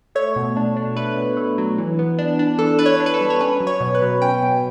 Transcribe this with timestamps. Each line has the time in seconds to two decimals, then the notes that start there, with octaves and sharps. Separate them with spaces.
0.15 A3 C#5
0.36 B2
0.57 D4
0.77 D4
0.96 A3 B4
1.17 B2
1.37 A3
1.58 F#3
1.78 E3
1.99 B3
2.18 D4
2.39 D4
2.58 E3 A4
2.79 D4 B4
2.86 C#5
3.00 D4
3.06 B4
3.14 A4
3.20 G3
3.30 C#5
3.41 C#4 B4
3.60 F#3
3.67 C#5
3.80 B2
3.95 B4
4.02 F#3
4.22 C#4 G5
4.42 B2